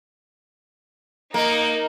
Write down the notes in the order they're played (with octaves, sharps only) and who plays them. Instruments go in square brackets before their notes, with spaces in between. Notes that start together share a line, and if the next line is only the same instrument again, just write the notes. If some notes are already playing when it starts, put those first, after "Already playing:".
[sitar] A#3 [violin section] D#4